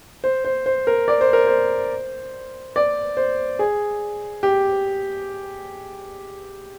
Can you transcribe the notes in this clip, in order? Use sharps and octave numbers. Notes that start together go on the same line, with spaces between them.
C5
C5
C5
A#4
D5
C5
A#4
C5
D5
C5
G#4
G4